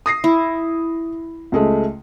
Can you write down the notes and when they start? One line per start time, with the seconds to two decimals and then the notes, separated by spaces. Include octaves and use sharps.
0.06 D#6 A#6 C7
0.24 E4
1.52 C#2 G#3 A3